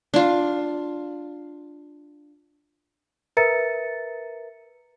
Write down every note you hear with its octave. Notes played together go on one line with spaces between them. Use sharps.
D4 F4
A#4 B4 E5 A#5 A6 C#7